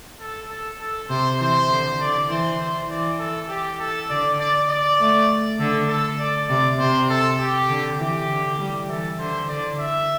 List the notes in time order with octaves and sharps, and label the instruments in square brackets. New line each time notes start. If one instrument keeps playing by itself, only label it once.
[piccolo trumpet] A4
A4
A4
[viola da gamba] C3 [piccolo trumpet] C5
[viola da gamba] E3 [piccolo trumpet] C5
[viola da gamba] D3
[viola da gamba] D3 [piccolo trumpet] D5
[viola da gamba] E3 [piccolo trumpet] C5
[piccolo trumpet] C5
[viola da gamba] E3 [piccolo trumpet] D5
[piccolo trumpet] A4
G4
A4
[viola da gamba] D3 [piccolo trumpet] D5
[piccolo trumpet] D5
D5
[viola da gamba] A3
[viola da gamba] D3 [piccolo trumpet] A4
[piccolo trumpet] A4
D5
[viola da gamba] C3 [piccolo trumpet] D5
[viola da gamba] C3 [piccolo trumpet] C5
[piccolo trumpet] A4
G4
[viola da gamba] D3
[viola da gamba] E3 [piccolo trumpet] G4
[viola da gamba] D3
G3
[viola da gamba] E3 [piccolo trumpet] A4
[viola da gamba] D3 [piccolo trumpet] C5
[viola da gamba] D3 [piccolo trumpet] D5
[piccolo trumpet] E5